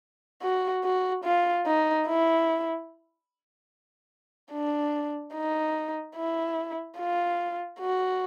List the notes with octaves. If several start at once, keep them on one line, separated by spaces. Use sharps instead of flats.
F#4
F#4
F4
D#4
E4
D4
D#4
E4
F4
F#4